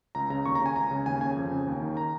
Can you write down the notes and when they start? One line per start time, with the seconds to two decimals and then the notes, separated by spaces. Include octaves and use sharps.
0.15 C#2 A#5
0.30 C#3 A#5
0.46 D#2 C#6
0.55 A#5
0.60 C#3
0.66 G#5
0.76 C#2 A#5
0.91 C#3
1.06 D#2 G#5
1.21 C#3 G#5
1.37 F2
1.51 C#3
1.67 D#2
1.82 D#3
1.97 A#5